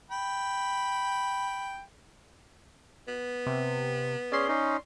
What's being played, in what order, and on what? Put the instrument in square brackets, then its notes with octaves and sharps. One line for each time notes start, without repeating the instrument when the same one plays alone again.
[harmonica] G5 B5
[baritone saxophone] B3
[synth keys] C3
[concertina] C#4 G#4 [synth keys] D5 C6
[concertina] C#4 D#4